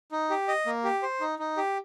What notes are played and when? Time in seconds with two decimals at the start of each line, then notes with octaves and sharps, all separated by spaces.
0.12 D#4
0.30 G4
0.48 D#5
0.66 A#3
0.84 G4
1.03 C5
1.21 D#4
1.39 D#4
1.57 G4